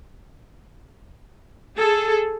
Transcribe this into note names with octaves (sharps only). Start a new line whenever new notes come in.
G#4 A4